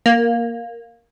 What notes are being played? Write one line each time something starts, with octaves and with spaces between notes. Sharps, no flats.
A#3